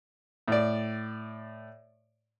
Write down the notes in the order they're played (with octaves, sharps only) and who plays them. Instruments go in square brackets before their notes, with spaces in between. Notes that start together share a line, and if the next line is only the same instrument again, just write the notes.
[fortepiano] A2 D5